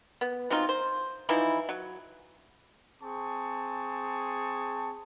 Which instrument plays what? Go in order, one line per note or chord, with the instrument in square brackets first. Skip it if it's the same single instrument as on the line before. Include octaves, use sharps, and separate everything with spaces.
[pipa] B3
F#3 C4 D#4 F4
C5
E3 F3 D#4 E4
F#3
[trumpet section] C4 G#4 A5 C#6